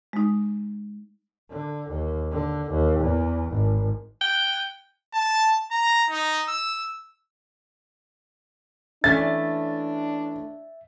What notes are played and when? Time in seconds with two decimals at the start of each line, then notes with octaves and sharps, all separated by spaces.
0.13 G#3 D#4
1.50 D3
1.90 D#2
2.32 D3
2.71 D#2
3.00 E2
3.50 G#1
4.21 G5
5.14 A5
5.71 A#5
6.10 D#4
6.48 E6
9.04 E3 A3 C#4 D4 E5 A6